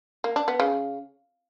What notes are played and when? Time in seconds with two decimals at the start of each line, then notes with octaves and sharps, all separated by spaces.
0.24 A#3
0.36 D4
0.48 B3
0.60 C#3